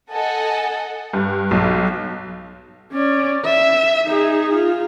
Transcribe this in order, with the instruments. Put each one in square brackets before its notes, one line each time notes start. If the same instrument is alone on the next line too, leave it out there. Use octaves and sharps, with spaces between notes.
[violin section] A4 D#5 F#5 G#5
[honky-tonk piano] G2
B1
[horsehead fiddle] C#4 D5
E5
D#4 G#4
F4